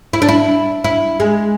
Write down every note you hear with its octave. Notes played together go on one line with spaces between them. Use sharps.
E4
D4
E4
E4
G#3